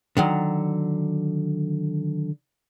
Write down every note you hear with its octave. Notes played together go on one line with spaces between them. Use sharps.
D3 D#3 F#3